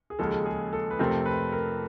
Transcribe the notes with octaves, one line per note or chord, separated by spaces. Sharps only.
G#4
D#2 C#3 F3 G#3 A4
G#4
A4
B4
F2 C3 F3 A3 C4 A#4
B4
A#4